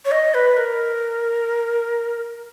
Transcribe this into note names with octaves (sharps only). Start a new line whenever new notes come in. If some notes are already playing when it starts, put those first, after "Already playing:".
C#5
D#5
B4
A#4